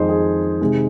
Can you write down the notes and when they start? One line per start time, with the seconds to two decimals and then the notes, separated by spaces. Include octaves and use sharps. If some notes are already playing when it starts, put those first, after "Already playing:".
Already playing: F2 D#3 G#3 C5 D#5
0.09 G#4
0.61 C3 D#3 G#3